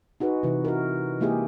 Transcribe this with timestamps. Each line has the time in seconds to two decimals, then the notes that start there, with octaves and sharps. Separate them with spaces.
0.20 D#4 F#4 G#4 B4
0.43 C3 E3 E4
0.65 F#4 A#4
1.20 E3 G#3 A#3 E4 G4 G#4